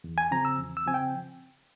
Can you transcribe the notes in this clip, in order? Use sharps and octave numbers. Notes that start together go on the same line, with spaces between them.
E2
G#5
C#3 F3 C4 A#5
E6
E2
E6
C#3 F3 C4 G#5
G5